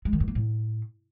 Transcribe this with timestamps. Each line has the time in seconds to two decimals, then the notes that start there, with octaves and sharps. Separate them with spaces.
0.05 G#3
0.13 D#3
0.20 G2
0.28 A#3
0.35 A2